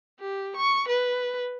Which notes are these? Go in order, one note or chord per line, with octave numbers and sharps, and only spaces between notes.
G4
C#6
B4